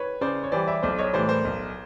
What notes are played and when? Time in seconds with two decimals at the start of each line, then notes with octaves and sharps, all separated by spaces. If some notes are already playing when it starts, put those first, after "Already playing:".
Already playing: B4 C#5
0.21 C#3 C5 D5
0.43 C#5
0.52 E3 G3 C5 D5
0.67 D5 E5
0.82 B1 C5 D5
0.98 C#5 D#5
1.13 A2 E3 G3 C5 D5
1.29 A#4 C5
1.45 B1